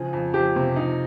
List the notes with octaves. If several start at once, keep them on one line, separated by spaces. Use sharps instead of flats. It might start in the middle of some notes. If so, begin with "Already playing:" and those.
Already playing: C#3 F3 G#4
F2
F2 G4
C3
F3 D#4